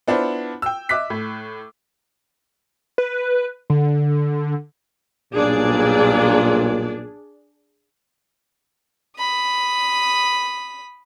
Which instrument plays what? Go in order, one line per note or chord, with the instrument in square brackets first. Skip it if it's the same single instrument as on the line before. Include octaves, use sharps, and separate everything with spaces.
[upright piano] B3 D4 E4 F4 C5
G5 E6
D#5 E5 D6 F#6 B6
A2
[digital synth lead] B4
D3
[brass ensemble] B1 G2 A#2 [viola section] D4 G#4 D5
[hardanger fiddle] B5 D#6